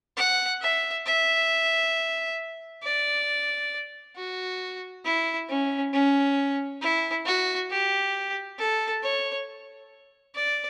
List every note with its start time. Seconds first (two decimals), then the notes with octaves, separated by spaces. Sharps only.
0.17 F#5
0.61 E5
1.06 E5
2.83 D5
4.16 F#4
5.05 E4
5.49 C#4
5.93 C#4
6.81 E4
7.26 F#4
7.70 G4
8.58 A4
9.03 C#5
10.35 D5